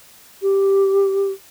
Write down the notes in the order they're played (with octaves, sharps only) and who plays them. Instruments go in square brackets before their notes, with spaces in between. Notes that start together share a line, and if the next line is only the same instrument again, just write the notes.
[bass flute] G4